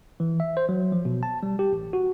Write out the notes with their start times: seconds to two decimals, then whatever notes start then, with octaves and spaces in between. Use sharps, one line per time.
0.20 E3
0.40 E5
0.57 C5
0.69 F#3
0.92 F3
1.05 B2
1.23 A5
1.43 G3
1.59 G4
1.73 A1
1.93 F#4